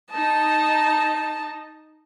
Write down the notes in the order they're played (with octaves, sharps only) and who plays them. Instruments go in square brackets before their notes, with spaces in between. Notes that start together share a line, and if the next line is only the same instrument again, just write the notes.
[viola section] D#4 D#5 [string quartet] A5